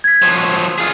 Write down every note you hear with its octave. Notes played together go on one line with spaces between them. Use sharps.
G#6 B6
F3 F#3
F4 G#4